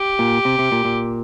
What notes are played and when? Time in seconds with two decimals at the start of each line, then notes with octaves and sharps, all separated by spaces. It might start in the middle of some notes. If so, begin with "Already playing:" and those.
Already playing: G4
0.19 A#2
0.45 C3
0.59 C3
0.72 A#2
0.85 A#2